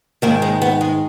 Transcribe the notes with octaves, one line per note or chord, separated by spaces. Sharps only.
G#2 D#3 A#3
G#3
B3
G#3